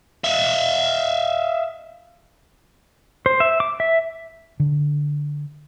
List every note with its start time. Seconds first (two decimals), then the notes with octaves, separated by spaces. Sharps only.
0.24 E5 F5
3.26 C5
3.40 E5
3.60 D6
3.80 E5
4.60 D3